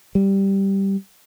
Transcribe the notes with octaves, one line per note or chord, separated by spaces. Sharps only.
G3